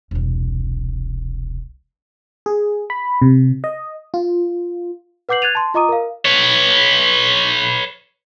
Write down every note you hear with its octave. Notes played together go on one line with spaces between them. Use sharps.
E1 C2
G#4
B5
C3
D#5
F4
B4 F#5 D6 G6 C7 F#7
F#6 G#6 A6 D#7 F7
A5 C6
F4 D#5 A#5 D6 D#6 D#7
A#4 F5
B4 C#5